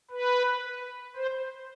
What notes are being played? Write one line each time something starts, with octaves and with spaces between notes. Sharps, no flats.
B4
C5